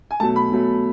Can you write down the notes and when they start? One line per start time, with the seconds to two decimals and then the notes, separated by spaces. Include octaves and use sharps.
0.11 G#5
0.20 B2 F#3 A3 A5
0.36 B5
0.51 B2 F#3 A3